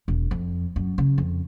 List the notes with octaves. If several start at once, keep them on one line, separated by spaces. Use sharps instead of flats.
E1
F2
F#2
C#3
F2